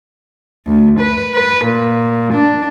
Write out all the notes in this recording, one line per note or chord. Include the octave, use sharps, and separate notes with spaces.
D2
B4
B4
A#2
D4